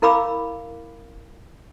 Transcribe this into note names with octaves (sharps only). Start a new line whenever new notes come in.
E4 A#4 F5 B5 D6 E6